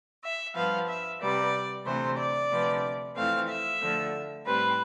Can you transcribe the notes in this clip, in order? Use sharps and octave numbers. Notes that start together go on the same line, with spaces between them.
E5
G2 F3 B3 F5
E5
C3 G3 B3 D5
D2 C3 E3 A3 C5
D5
D2 C3 F3 B3
F2 E3 A3 C4 F5
E5
D2 D3 F3
A2 G3 C4 B4